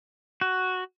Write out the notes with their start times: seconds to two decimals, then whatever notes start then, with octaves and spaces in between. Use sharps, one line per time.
0.41 F#4